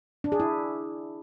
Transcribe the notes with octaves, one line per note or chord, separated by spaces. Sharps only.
D4
G#4
E4